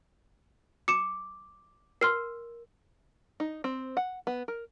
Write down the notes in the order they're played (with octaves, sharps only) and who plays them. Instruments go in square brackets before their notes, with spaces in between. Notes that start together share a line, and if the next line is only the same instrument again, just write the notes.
[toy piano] D6 [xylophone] C#7 E7
[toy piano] A#4 [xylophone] C6 F6 C7
[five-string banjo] D#4
C4
F#5
B3
A#4